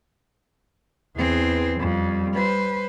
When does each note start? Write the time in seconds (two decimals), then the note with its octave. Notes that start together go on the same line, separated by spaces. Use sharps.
1.17 E2 E3 C4 G#4
1.79 F2 G3
2.34 B4 C5